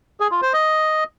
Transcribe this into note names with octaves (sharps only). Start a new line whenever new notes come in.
G#4
F4
C5
D#5